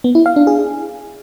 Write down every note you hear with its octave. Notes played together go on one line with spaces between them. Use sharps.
B3
E4
F5
D4
G#4